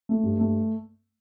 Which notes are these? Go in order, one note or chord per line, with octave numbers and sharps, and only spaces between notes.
A3
G2
A3